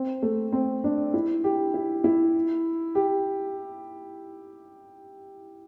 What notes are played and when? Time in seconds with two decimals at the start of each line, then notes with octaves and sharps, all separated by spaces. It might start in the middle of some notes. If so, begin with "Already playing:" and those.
Already playing: C4
0.22 A3
0.53 C4
0.84 D4
1.14 E4
1.44 G4
1.74 E4
2.04 E4
2.95 G4